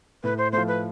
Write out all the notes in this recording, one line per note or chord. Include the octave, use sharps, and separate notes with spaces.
A2 B4
C5
F3 A3 C5
B4